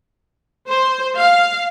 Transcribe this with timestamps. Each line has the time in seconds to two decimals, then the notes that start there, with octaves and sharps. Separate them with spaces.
0.69 C5
1.17 F5